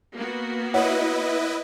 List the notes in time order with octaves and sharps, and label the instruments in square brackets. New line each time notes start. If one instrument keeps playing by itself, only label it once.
[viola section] A#3 B3 F#4
[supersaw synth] E4 B4 D#5 [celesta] C#5 F#5